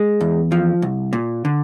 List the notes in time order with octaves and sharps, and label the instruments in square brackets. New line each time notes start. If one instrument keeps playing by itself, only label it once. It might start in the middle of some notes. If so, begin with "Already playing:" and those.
Already playing: [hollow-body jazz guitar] G#3
E2
F3
C2
A#2
D3